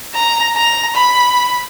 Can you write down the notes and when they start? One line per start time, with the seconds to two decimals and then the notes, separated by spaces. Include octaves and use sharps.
0.13 A#5
0.55 A#5
0.96 B5